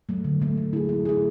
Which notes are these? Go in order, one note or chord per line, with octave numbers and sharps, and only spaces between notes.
F#3 A3
D3
F#3 A3
A3
E4 G#4
A3
E4 G#4